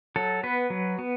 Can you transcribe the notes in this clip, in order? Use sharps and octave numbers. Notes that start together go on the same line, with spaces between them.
F#3 A4
B3 B4
F#3
B3